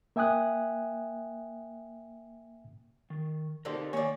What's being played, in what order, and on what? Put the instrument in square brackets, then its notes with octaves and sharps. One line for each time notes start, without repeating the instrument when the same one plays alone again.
[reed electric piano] A#3 E5 G5 G#5 D#6 F#6
[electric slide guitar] D#3
[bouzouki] D3 A#3 C4 [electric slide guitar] D#4 G4 A#4
[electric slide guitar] D#3 A#3 G#5 [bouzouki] C#5 D5